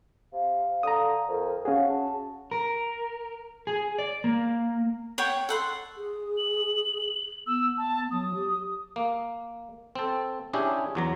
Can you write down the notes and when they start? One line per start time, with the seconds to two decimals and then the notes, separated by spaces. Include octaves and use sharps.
0.33 C3 F5
0.83 D3 A#5 D#6
1.28 F2 A#4
1.65 C#4 F#4 G#4 F5
1.89 A5
2.51 A#4
3.67 G#4
3.98 D5
4.24 A#3
5.18 C#5 F#5 G5
5.49 A4 F#5 C6
5.97 G#4
6.37 F#7
7.47 B3 E6
7.78 A5
8.11 F#3 D#6
8.35 G4
8.96 A#3
9.95 C4 A4
10.53 C#4 D4 E4 G4 G#4
10.95 E2 F#3 A#5